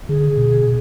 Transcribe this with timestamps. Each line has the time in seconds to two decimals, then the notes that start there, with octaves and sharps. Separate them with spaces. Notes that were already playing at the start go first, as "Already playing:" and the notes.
0.09 D3 G#4
0.37 B2